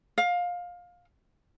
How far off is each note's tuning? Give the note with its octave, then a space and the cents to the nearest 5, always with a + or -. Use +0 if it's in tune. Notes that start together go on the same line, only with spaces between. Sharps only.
F5 +20